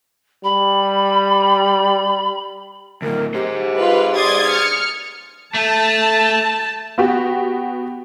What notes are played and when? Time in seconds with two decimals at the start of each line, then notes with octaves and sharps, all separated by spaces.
0.44 G3 B5
3.02 D2 A2 A#4
3.34 G4 G#4 C5
3.78 F4 B4
4.14 D5 C6 D#6 G#6 A6
4.48 F6 C#7
5.54 A3 A5
6.98 B3 F#4 G4